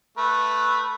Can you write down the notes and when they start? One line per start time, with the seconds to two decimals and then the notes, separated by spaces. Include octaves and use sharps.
0.17 A3 B4